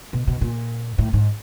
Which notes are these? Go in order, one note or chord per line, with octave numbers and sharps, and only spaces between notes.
B2
B2
A#2
A2
G#2